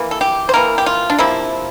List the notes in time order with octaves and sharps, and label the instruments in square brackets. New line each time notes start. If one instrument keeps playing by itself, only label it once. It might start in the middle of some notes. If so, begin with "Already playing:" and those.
Already playing: [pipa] E3 A#3
A4
G4
C5
E3 A#3 A#4
G4
F4
D4
C3 F3 A#3 E4